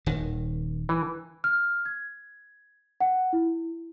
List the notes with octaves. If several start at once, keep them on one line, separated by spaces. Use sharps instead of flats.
D#1 D#3
E3
F6
G#6
F#5
E4